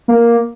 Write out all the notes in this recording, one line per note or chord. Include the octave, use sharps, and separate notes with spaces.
A#3